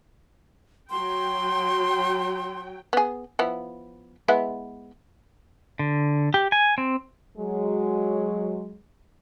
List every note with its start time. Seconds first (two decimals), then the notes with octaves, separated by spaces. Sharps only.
0.91 F#3 G5 C6
2.93 B3 G#4
3.39 F3 B3 E4
4.28 G#3 B3 E4
5.79 D3
6.34 G4
6.52 G#5
6.78 C4
7.38 F#3 G#3